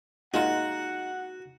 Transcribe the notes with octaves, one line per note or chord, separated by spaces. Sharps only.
A#2 G#3 D#4 F4 F#4 F#5